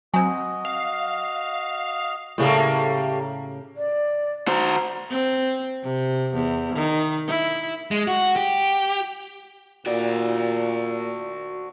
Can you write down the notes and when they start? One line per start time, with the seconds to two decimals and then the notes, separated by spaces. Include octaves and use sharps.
0.14 F#3 C4 F#4 D#5 G#5
0.65 F5
2.38 A2 C#3 G3 A3 A#3
3.77 D5
4.48 F#4 C5 A#5
5.10 C4
5.83 C3
6.34 E2
6.75 D#3
7.27 E4
7.91 G#3
8.07 F#4
8.36 G4
9.87 A#2 F#4 D5